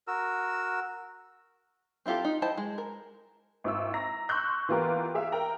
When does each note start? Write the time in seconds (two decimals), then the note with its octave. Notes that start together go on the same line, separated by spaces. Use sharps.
0.07 F#4 A#4 E6
2.06 C4 E4 F4 G4 A4
2.25 D#4
2.42 E4 C5 D#5 G5 A5
2.57 G#3
2.78 A#4
3.64 G#1 E4 E6
3.94 A#5 A#6
4.29 C6 C#6 E6 F#6 G6
4.69 E3 B3 F4 G4 A#4
5.14 G4 G#4 E5 F5
5.32 A#4 G5 A#5